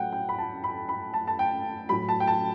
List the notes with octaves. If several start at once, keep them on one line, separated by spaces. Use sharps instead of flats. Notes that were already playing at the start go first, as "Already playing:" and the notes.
Already playing: A2 F#3 F#5 G5
G5
B5
A5
B5
B5
A5
A5
G5
A2 F#3 B5
A5
G5
A5